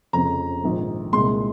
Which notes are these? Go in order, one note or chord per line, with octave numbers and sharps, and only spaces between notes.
F1 F2 C#3 A#5
A#1 G#2 D#3
C2 A#2 G#3 C6